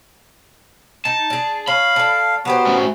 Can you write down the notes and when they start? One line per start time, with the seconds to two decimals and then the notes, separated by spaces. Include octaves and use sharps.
1.05 D#4 A5
1.30 D4 G#4
1.67 C#4 F5 B5
1.96 A4 D5
2.45 F#3 B3 G4 C5
2.66 A3 C#4